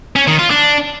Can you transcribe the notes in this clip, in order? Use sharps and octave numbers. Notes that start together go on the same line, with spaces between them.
C#4
D#3
F4
D4